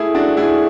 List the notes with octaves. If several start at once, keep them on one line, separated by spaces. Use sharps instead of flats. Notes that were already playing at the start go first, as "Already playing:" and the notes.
Already playing: A3 E4 G#4
D4 F#4
A3 E4 G#4